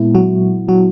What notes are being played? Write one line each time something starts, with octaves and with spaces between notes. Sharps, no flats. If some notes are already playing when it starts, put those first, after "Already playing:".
Already playing: A#2 G#3 B3 E4
F#3 F#4
F#3 F#4